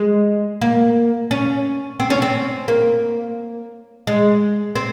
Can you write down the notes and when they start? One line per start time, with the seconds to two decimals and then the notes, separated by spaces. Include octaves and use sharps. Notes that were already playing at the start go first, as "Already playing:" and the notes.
Already playing: G#3
0.61 A#3
1.31 C#4
2.00 C4
2.10 C#4
2.22 C4
2.68 A#3
4.07 G#3
4.76 C4